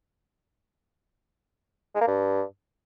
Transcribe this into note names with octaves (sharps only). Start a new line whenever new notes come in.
G#3
A#3
G2